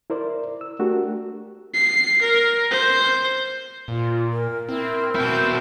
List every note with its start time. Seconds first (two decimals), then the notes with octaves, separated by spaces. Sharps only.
0.10 E4 A#4 C5 D5
0.61 E6
0.79 A3 D4 F#4 G4 A#4
1.74 C7
2.22 A#4
2.71 C5
3.88 A#2 F4
4.32 A#4
4.69 C4 E4 A#4
5.15 B2 C4 E4 G6